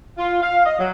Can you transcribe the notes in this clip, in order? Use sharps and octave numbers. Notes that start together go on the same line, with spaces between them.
F4
F5
D#5
F#3